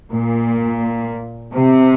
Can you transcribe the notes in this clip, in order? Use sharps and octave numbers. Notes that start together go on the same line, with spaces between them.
A#2
C3